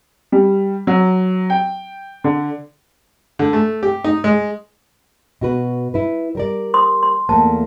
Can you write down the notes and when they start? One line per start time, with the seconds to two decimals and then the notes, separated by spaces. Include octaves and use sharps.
0.32 G3
0.87 F#3
1.50 G5
2.24 D3
3.39 D3
3.53 A3
3.83 G4
4.04 D#4
4.24 G#3
5.41 B2 F#4 B4
5.94 E4 B4
6.35 G3 A#4 D5
6.74 C6 D#6
7.03 C6
7.29 E2 A3 A#3 A5